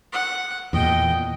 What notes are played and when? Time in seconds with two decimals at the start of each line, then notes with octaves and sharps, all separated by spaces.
0.13 F#5
0.73 E2 A#2 D#5 G5